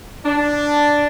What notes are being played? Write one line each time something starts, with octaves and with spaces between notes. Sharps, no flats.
D4